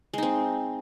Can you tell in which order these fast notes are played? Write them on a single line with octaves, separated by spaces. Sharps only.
G#3 D#4 C4